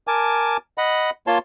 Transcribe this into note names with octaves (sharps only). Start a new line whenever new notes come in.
A#4 G#5 A5 D6
D#5 F#5 B5
A#3 F4 C#5 A5 C6